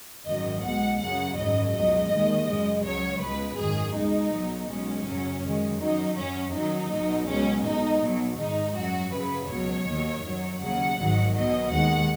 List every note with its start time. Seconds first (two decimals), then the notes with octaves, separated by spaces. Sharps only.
0.25 G#1 F#2 D#3 D#5
0.62 B1 B2 G#3 F#5
0.99 F#2 C#3 F#3 F#5
1.37 G#1 F#2 C#3 F#3 D#5
1.73 C#2 B2 F#3 D#5
2.10 D#2 D#3 G#3
2.47 F#2 C#3 G#3
2.84 C#2 C#3 F#3 C#5
3.21 C#2 B2 G#3 B4
3.58 G#1 F#2 D#3 G#4
3.95 C#2 B2 G#3 D#4
4.32 B1 B2 F#3
4.69 B1 B2 G#3 C#4
5.06 F#2 C#3 F#3
5.43 F#2 D#3 G#3
5.80 F#2 F#3 D#4
6.16 F#2 F#3 C#4
6.53 F#2 D#3 F#3 D#4
6.91 B1 B2 F#3
7.27 C#2 B2 F#3 C#4
7.64 B1 B2 G#3 D#4
8.01 B1 B2 F#3
8.38 G#1 G#2 D#3 D#4
8.75 F#2 F#3 F#4
9.12 F#2 C#3 F#3 B4
9.49 C#2 B2 F#3 C#5
9.86 D#2 D#3 F#3
10.23 F#2 F#3
10.60 D#2 C#3 F#3 F#5
10.97 G#1 G#2 D#3 F#3
11.34 B1 B2 F#3 D#5
11.71 D#2 D#3 G#3 F#5